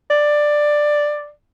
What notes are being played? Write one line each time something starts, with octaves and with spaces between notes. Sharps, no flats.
D5